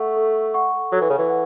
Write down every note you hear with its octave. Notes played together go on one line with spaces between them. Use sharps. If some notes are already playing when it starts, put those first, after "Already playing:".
Already playing: A3 A4 F#5 C#6
A4
F#5 C#6
F#3 A4
E3
C#3
E3
F#5